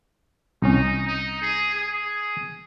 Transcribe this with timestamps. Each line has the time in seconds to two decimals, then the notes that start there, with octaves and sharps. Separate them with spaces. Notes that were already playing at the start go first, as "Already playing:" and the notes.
0.62 C2 C#4 D#4
1.07 D#4
1.42 G#4
1.75 G#4